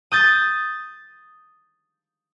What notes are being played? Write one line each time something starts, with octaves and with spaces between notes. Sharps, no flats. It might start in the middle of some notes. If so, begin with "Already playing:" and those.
D#6 G6 A6